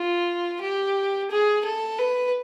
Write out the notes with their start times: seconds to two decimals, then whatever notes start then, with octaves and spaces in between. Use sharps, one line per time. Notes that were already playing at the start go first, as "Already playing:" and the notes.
Already playing: F4
0.61 G4
1.31 G#4
1.65 A4
1.99 B4